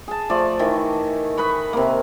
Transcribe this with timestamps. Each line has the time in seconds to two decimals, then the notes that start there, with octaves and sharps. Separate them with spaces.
0.08 G#4 A5
0.30 F3 A3 D5
0.59 D#3 E3
1.37 B4 D#5 B5 C#6
1.73 C3 A#3